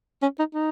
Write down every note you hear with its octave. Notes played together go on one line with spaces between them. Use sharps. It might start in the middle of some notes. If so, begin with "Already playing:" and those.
C#4
D#4
D#4